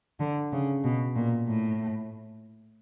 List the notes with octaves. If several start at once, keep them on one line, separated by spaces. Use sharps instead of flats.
D3
C#3
B2
A#2
A2